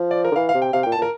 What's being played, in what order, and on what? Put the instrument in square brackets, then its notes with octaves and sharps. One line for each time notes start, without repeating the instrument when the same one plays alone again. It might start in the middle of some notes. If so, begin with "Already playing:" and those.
Already playing: [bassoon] F3
[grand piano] D5
A#4
[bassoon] D3
[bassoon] E3 [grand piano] F5
[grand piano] F5
[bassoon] C3
[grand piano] G5
[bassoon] C3 [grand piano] F5
[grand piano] G5
[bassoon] A#2
[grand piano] A5
[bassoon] A#2
[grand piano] A#4